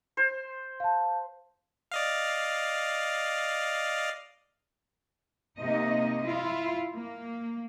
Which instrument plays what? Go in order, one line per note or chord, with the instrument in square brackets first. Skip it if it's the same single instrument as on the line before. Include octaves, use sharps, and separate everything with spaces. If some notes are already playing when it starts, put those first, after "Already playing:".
[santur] C5
[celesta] F5 A5
[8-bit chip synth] D5 D#5 F5
[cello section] C3 A#3 D#4 D#5
E4 F4
A#3